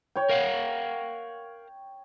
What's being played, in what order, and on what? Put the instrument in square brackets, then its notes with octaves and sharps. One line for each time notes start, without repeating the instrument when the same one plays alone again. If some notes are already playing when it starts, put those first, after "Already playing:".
[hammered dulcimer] C#5 G5
[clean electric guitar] A#4 F5 F#5